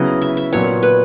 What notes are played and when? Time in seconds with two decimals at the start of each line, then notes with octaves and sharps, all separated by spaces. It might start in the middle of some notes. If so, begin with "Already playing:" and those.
Already playing: C#3 F#3 B3 E4 D#5
0.22 E5
0.37 E5
0.53 A#2 F#3 B3 C#5
0.83 B4